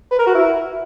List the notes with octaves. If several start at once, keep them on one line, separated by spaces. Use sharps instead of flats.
B4
A#4
F#4
E4